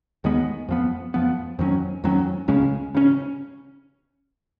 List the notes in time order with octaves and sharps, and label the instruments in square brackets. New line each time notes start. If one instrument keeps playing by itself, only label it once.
[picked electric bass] D#2 D#3 G#3 B3
F2 F3 B3
F2 F3 B3
F2 D#3 F#3 C#4
F2 D#3 F#3 C#4
C#2 C#3 G#3 C#4
C#3 G#3 C#4